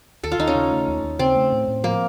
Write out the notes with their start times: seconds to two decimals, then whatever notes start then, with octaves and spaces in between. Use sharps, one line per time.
0.23 D#2 A4
0.32 F4
0.39 D#2 D#4
0.47 C#4
0.55 C#3
0.71 A3
0.88 D#2
1.04 D#2
1.19 C#3 C4
1.36 A3
1.52 A2
1.68 A2
1.84 F3 A#3